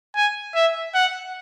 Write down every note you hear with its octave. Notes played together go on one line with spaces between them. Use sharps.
G#5
E5
F#5